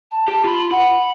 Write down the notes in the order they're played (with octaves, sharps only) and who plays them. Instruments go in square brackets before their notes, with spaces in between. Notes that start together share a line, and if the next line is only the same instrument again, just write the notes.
[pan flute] A5
[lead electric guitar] G4 [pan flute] A5
[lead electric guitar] F4 [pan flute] B5
[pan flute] F#5 [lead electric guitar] B5